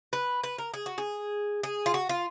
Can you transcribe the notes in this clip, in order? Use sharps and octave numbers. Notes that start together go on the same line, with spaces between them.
B4
B4
A#4
G#4
F#4
G#4
G#4
F4
F#4
F4